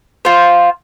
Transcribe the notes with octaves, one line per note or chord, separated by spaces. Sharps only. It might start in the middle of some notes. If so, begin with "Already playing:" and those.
F4 C5